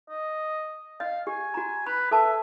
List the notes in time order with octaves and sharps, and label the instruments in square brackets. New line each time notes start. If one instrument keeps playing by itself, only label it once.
[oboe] D#5
[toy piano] D#5 [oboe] F5
[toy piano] G4 [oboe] G#5
[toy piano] F#4 A#5
[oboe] B4 [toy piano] B5
[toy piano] A4 B4 A5 [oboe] E5